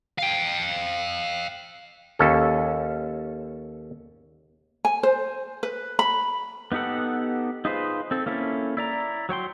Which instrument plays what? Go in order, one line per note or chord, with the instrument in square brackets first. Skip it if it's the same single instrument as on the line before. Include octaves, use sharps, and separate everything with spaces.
[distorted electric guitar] F5 G5
[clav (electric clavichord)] D#2 C#4 A4
[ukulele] G#5
C5
B4
B5
[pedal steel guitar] B3 D#4 G4 A4 F#5
D#4 F4 G#4 B4 C5
C4 A4
A#3 C#4 E4 A4
E4 D5 A#5
F#3 C#5 G5 C6